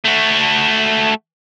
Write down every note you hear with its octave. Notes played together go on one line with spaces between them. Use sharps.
A3 F#4